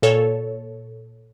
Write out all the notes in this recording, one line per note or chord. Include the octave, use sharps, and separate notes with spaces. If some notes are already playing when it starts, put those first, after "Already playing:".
A#2 A4 C#5